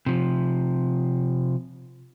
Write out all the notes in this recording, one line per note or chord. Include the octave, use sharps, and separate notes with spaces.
C3 F3